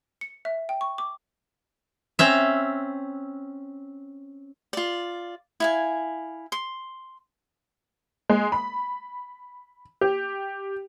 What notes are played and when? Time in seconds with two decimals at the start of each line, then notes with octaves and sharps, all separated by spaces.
0.21 C#7
0.45 E5
0.69 G5
0.81 C#6
0.98 D6
2.19 C4 C#4 E5
4.73 F4 D5
5.60 E4 F5 G#5
6.52 C6
8.29 G#3
8.52 B5
10.01 G4